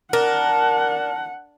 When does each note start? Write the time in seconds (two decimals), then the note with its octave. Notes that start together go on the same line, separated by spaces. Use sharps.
0.13 D4 A#4 F#5